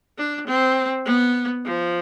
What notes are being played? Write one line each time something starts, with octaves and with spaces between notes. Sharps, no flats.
D4
C4
B3
F3